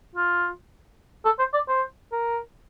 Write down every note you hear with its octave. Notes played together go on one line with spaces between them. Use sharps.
F4
A4
C5
D5
C5
A#4